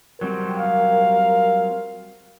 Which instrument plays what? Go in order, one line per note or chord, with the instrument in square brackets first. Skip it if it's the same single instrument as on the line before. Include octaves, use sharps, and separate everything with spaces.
[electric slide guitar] F#3 G3 C4 [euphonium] A#4
[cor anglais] F5